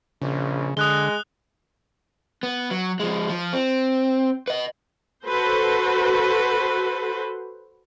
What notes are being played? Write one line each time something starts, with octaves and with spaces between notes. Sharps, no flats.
A#1 C#3
D3 G#3 D#6 F#6 G7
B3
F#3
F3 G#3
F3
C4
B4 D#5
F#4 A4 B4 C5